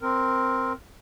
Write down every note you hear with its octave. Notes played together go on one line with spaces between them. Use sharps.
C4 A#4